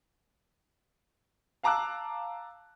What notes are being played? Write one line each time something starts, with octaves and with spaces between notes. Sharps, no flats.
F5 A5 A#5 D6 E6 F#6